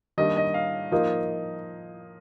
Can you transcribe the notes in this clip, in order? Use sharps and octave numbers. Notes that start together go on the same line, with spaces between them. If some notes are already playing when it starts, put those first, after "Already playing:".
D#3 G3 A#3 D4 D#5
D#5
F5
F3 A#3 D#4